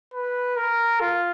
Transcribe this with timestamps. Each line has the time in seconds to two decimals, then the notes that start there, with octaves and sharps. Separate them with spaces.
0.14 B4
0.57 A#4
1.01 F4